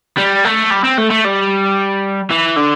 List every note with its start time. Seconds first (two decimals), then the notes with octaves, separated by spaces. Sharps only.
0.18 G3
0.45 A3
0.71 G3
0.84 C4
0.98 A3
1.10 A3
1.24 G3
2.31 E3
2.57 D3